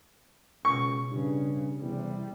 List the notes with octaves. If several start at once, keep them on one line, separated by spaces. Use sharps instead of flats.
C#2 B2 C#6
G2 C#3
E2 C3 G3